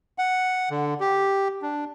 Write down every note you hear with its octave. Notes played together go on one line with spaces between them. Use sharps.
F#5
D3
G4
D4